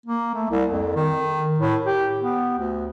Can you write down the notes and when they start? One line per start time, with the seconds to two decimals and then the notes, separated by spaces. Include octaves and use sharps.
0.06 A#3
0.34 A3
0.50 C2
0.71 F2
0.95 D#3
1.59 A2
1.85 G4
2.21 B3
2.58 D2